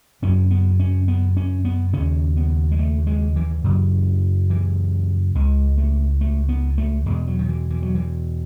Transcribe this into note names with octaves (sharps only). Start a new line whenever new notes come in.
F#2 C#3 C#4
B3
C#4
B3
C#4
B3
D#2 C#3 C#4
B3
G#3
A3
G#3
E3
F#2 C#3
E3
C#2 C#3 G#3
A3
A3
B3
A3
E2 B2 G#3
F#3
D#3
E3
E3
F#3
E3